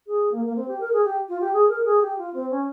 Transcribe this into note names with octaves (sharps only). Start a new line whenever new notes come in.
G#4
A#3
A#3
C4
G4
A#4
G#4
G4
F4
G4
G#4
A#4
G#4
G4
F4
C4
C#4